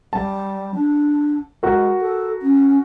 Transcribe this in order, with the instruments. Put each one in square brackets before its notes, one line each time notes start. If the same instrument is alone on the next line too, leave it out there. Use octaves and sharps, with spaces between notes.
[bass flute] G3 [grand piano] A5
[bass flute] D4
[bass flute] G#3 [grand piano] F#4 A#4
[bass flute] A4
C#4